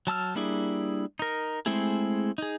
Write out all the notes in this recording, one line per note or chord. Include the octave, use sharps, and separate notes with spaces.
F#3 A5 E6 F6
G3 A#3 D4 E4 G#4
D#4 A#4
G#3 A3 C4 E4 G#4
D#4 G#4